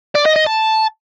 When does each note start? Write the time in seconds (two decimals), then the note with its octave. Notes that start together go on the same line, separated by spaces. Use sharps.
0.15 D5
0.25 D#5
0.36 D#5
0.46 A5